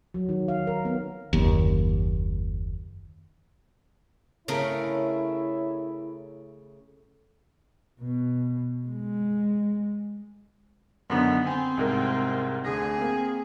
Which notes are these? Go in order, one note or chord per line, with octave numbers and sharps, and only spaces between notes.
F#3
D#3
F5
A#4
B3
F#1 D#2
C#3 A3 E4 A#4 C#5
B2
G#3
F#2 D3 D#3 B3
C4 G#5
C2 G#2 A#4
D2 D3 G#4 A#6
A#3 C4